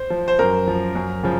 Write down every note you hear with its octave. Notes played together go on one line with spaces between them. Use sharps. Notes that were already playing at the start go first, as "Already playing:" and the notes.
Already playing: C5
F3
C5
F#2 A#4
F3
F#2
C#3 F3